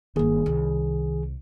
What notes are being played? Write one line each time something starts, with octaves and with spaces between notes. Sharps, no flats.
G1 D#3 A#3 G#4
C2